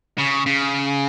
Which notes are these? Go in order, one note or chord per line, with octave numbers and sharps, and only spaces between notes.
C#3
C#3